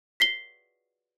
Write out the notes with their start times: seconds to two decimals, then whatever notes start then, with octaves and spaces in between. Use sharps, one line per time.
0.20 B6 C7 G7